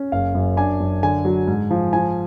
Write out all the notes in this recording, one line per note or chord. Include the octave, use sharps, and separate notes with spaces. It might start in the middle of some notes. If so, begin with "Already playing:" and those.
Already playing: C#4
F#1 F5
F#2
D4 G#5
F#2
D3 G#5
F#3
G#2
F3
F3 G#5